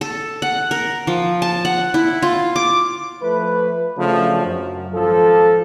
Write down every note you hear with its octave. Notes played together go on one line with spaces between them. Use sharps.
A4
F#5
A#4
F3
A5
F#5
E4
F4
D6
F3 A3 B4
C#3 F3 F#3 A3 D4
F#2
G#1 F3 A4